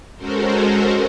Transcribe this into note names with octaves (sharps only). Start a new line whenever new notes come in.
G#3 C#4 F#4 A4 A#4 C5